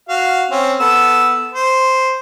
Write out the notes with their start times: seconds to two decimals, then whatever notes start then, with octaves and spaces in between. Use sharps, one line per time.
0.09 F#4 F5
0.51 C4 C#4
0.80 B3 A4 E6
1.54 C5